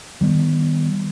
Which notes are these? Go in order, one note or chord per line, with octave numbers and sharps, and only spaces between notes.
D#3 G3 B3